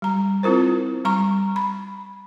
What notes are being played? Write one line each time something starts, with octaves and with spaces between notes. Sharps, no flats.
G3 A#5
C4 E4 F4 A#4 C5
G3 A#5 C#6
B5